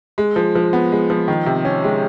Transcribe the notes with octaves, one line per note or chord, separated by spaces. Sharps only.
G#3
F3
F3
B3
G#3
F3
D#3
C3
C#4
G#3